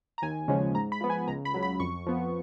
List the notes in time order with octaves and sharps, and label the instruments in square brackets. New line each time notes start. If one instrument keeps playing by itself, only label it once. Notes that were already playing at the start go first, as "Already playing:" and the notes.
[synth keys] A#5
D#2 G#5
C#3 F3 G#3 C#4
G#2 A#5
B5
F3 B3
G#5
C#2 A#5
B5
C#3 F#3
B5
F2 C#6
F3 B3